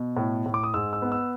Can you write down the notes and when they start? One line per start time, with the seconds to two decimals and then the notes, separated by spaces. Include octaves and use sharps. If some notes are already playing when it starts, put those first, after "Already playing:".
Already playing: B2
0.17 A2
0.46 A2
0.54 D6
0.63 D#6
0.74 G#2 E6
0.93 E6
1.02 B3
1.12 E6